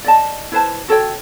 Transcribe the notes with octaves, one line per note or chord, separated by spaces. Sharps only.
D5 D#5 A5
E4 B4 C5 A5
F#4 A4 C#5 G5